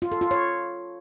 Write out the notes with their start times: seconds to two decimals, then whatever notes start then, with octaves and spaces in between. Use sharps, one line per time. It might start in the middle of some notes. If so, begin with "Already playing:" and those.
0.02 F4
0.12 A4
0.21 F4
0.31 C#5